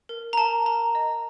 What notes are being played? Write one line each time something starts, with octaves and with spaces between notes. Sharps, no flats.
A#4
A#5
A#4 A5
A#4 A#5
D#5